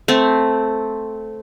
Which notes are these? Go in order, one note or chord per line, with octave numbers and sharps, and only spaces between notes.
A3 C4